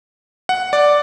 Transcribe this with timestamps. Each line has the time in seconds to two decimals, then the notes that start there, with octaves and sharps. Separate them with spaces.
0.49 F#5
0.73 D5